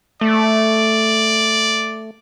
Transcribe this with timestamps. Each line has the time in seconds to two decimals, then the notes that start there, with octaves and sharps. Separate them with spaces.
0.21 A3 D5